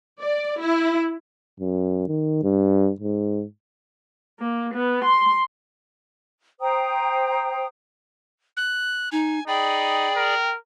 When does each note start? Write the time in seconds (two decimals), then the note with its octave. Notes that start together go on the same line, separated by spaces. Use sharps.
0.19 D5
0.61 E4
1.60 F#2
2.08 D#3
2.43 G2
3.00 G#2
4.39 A#3
4.73 B3
5.04 C6
6.60 C5 G5 A#5 D#6
8.57 F#6
9.12 D#4 G#5
9.48 D#4 G#4 D5 G5 B5
10.16 A#4